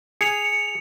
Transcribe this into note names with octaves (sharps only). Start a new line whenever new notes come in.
G#4 C#7 F7